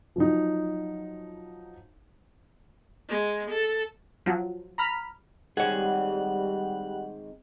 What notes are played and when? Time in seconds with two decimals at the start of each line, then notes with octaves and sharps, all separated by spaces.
0.16 F3 F#3 D#4
3.08 G#3
3.51 A4
4.26 F3 F#3
4.78 A#5 B5 F6 B6
5.57 D#3 G3 G#3 C4 G#4 C#5 F#5